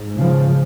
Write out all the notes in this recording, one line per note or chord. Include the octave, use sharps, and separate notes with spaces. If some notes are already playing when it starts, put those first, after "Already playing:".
Already playing: G#2
C#3 F3